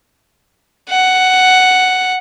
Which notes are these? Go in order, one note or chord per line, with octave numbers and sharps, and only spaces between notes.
F#5